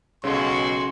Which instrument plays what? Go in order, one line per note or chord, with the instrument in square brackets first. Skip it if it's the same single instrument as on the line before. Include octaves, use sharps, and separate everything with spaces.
[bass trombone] B1 [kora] C#3 A4 [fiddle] G#3 F#4 [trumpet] C6